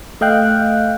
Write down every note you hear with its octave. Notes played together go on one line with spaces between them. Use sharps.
A3 D#5 F5 G5 F#6